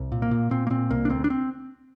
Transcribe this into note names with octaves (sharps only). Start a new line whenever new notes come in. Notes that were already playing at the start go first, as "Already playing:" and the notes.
Already playing: C2
A#2
A#3
A#2
A#2 C4
A#3
A#2 C4
C2 A#3
D4
D2 C4
D4
C4